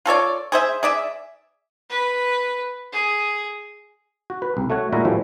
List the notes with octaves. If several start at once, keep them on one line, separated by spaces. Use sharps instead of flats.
F4 A4 C#5 D5
G#4 C5 E5
G#4 D5 E5
B4
G#4
F#4
B4
C2
A3 F#4 C#5 F#5
A#2 G#3 E4 F#4 E5 A#5
A2 E3 F3 G3